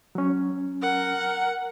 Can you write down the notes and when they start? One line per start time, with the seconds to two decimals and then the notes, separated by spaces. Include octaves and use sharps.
0.15 F#3 C#4
0.82 A#4 F#5